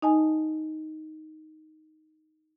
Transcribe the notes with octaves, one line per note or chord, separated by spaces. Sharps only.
D#4 D#5 G#5 A5